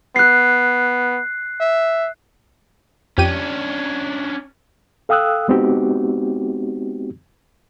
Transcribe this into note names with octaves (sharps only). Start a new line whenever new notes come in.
B3 F#6 C7
E5
F2 C#4 D4 G4 D#7
A4 F5 G5 D#6 E6 F#6
G#3 B3 C4 D#4 F#4 G4